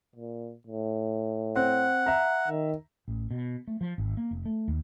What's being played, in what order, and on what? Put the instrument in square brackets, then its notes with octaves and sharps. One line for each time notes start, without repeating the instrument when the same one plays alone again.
[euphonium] A#2
A2
[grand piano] C4 [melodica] F#5
[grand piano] E5 A#5
[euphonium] D#3
[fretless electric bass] A1
B2
A3
F3
G#1
A#3
F1
A3
D#2